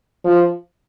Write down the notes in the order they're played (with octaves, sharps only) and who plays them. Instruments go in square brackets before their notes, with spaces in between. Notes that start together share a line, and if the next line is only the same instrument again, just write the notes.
[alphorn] F3